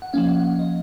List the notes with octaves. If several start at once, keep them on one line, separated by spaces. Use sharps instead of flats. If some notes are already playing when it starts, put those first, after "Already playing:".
F#5
F3 A#3 C#4 F5
F#5
F#5
F5
D#5